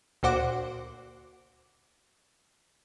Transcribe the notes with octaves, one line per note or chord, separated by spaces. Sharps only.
D2 A#2 F#4 C5 F#5 D6